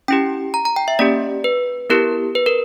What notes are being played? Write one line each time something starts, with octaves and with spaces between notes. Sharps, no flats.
C#4 E4 G4 G5
A#5
A#5
G5
E5
A#3 C#4 G4 D5
B4
B3 E4 G4 A#4
B4
A#4